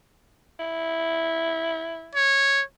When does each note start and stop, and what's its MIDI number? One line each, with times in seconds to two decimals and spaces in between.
0.59 2.16 64
2.15 2.62 73